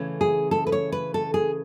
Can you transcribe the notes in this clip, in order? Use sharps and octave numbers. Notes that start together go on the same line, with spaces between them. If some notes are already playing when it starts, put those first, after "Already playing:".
Already playing: C#3 E3 A3 C#4
G#4
A4
B4
C#5
B4
A4
G#4